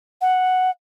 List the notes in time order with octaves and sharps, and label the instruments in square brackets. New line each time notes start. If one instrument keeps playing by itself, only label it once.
[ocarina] F#5